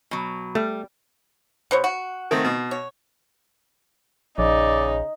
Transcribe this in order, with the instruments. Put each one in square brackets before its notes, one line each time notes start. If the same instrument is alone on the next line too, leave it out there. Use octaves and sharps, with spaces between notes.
[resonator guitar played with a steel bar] B2 F#3
[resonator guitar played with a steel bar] G3 [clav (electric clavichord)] A3
[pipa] B2 C5 C#5
F#4
[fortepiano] D#3 A3 C4
B2
[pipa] C#5
[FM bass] A#1 [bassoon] C#3 [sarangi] D#4 [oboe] D5